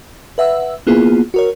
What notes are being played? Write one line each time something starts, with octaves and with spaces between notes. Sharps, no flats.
B4 E5 F#5 E6
A#3 B3 E4 F4 G#4
F#4 A#4 C#5